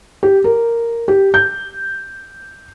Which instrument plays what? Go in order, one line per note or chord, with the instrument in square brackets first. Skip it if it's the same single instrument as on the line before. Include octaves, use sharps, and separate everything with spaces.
[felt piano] G4
A#4
G4
G6